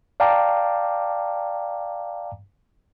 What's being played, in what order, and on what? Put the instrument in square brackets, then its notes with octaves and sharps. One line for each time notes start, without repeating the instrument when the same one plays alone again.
[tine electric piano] D5 F5 G5 A5 A#5 D6